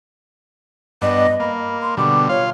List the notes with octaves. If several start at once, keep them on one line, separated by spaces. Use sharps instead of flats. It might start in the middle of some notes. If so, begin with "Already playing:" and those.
G2 B3 D4 D#5
A#3 B5
C6
B2 D3 G3 D6
F4 C#5 F5